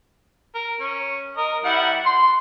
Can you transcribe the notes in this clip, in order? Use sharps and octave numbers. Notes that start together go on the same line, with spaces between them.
A#4
C#4
A#4 D#5
G3 E4 F#5
C6